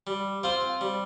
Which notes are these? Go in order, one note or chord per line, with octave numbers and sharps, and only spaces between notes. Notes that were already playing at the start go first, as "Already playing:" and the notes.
G3
C4 F4 C5
G3